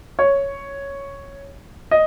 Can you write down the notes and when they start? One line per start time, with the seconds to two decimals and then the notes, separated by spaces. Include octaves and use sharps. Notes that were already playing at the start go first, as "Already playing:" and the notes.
0.19 C#5
1.91 D#5